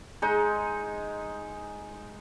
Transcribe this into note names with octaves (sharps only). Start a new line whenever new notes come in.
G#3 D#4